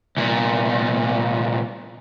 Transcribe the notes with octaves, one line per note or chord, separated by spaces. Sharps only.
C2 A#2